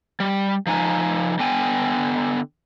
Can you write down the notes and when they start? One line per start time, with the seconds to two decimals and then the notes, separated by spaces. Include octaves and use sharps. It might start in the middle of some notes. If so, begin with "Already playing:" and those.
0.20 G3
0.67 F3 D#4 G#5
1.39 D3 B3 G5 G#5